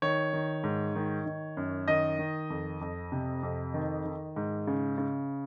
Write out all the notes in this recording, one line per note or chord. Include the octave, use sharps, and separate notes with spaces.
D#3 C#5
D#3
G#2
D#3
D#3
F#2
D#3 D#5
D#3
F2
F2
C3
F2
D#3
D#3
G#2
C#3
C#3